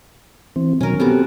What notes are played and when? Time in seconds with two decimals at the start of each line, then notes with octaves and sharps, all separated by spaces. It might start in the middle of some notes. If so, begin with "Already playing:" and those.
0.56 E3 C4
0.81 B2 D#3 F#3 C#4 A#4
1.00 B2 B3 C4 G4 A4 D6